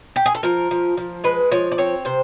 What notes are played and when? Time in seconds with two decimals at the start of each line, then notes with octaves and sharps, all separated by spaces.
0.16 G4
0.26 G#4
0.35 A4
0.43 F3 A#4
0.71 F3
0.97 F3
1.24 G#3 B4
1.52 F3 C#5
1.72 D5
1.78 C4 C#5
2.05 C3 C5